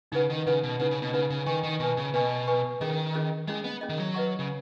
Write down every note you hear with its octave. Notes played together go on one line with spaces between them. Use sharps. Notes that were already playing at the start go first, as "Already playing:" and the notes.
C#3 D#4 B4 F#5
D#3
C#3 D#4 B4 F#5
B2
C#3 D#4 B4 F#5
C#3
B2
C#3 D#4 B4 F#5
C#3
D#3 B4 G#5 C#6
D#3
B2 B4 G#5 C#6
C#3
B2 B4 G#5 C#6
B4 G#5 C#6
D#3 C#4 G#4 D#5
C#4 G#4 D#5
G#3 C#4 G#4 D#5
B3
C#4 G#4 D#5
D#3
F#3
B4 D#5 F#5 C#6
C#3